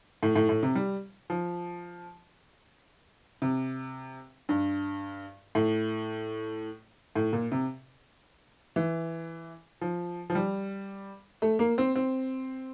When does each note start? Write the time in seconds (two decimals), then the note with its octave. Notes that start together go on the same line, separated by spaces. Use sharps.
0.23 A2
0.36 A2
0.49 A2
0.63 C3
0.75 G3
1.30 F3
3.42 C3
4.49 G2
5.55 A2
7.16 A2
7.33 A#2
7.52 C3
8.76 E3
9.81 F3
10.30 F3
10.35 G3
11.42 A3
11.59 A#3
11.78 C4
11.96 C4